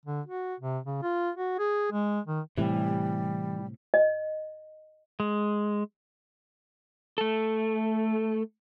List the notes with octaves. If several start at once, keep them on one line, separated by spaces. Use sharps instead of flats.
D3
F#4
C3
C#3
F4
F#4
G#4
G#3
D#3
A2 C3 E3 G3
D#5
G#3
A3 A4